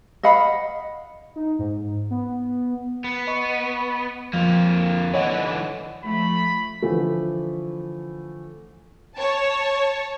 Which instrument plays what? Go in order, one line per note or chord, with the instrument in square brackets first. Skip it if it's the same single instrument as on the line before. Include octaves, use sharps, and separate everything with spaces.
[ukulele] D#5 F5 F#5 B5
[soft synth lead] D#4
G#2
B3
[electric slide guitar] B3
[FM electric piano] D#5 B5 C#6
[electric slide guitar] F2 A#3 [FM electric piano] F3
[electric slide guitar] D3 E3 [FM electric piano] C#5 D#5 F#5
[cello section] F3 A3 [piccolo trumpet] B5
[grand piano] D3 E3 F3 A3
[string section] C#5 A5